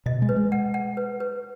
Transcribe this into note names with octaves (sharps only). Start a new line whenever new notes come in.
B2 D#5
G#3
B4
G#3
F#5
F#5
B4
B4